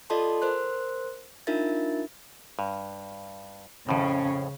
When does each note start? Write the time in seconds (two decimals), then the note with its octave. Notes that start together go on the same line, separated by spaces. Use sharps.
0.10 F4 A4 D5 D#5 A5 C6
0.42 A#4 C5 C6 F#6
1.47 D4 D#4 F4 A#4 E5 A6
2.59 G2
3.89 F2 A2 C#3 C#4